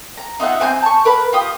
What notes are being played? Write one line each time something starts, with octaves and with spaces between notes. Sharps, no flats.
A#5
D#4 F4 E5 F#5
C4 G#5 C6 G6
A5 C#6
A#4 B4 B5
F4 G4 D#6